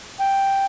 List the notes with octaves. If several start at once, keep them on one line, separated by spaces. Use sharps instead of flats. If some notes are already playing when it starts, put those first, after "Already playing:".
G5